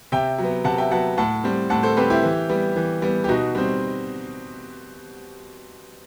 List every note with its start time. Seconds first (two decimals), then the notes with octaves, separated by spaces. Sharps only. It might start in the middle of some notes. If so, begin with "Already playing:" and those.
0.12 C3 E5 G5
0.38 F#3
0.43 B3
0.64 C3 F#5 A5
0.78 E5 G5
0.91 F#3 B3 F#5 A5
1.17 A2 F#5 A5
1.44 G3 C4
1.70 A2 F#5 A5
1.83 A4 C5
1.97 G3 C4 G4 B4
2.10 E4 G4
2.23 E3
2.49 G3 B3
2.76 E3
3.02 G3 B3
3.24 G4
3.28 B2 D#4 F#4
3.55 G3 C4